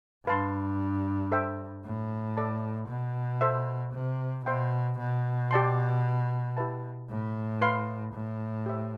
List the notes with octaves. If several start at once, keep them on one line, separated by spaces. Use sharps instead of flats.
G2 B4 F5 A5 C6
A4 C5 E5 G5
A2
A4 D5 A5
B2
A4 C5 E5
C3
B2 C5 E5 G5 C6
B2
G4 D5 A5 C6
E4 G4 B4 E5 A5
A2
B4 F5 C6
A2
G4 C5 E5